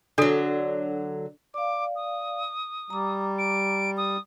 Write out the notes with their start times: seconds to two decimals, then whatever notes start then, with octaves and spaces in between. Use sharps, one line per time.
0.18 D3 F#3 D4 A4
1.54 D5 F5 D6
1.96 D#6
2.90 G3 A#5 D6
3.38 D7
3.97 D#6